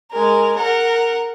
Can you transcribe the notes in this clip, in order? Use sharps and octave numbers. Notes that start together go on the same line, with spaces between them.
G#3 A#4
A#4 F#5